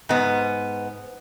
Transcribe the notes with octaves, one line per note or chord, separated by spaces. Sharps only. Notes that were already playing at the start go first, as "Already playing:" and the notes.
G#2 B3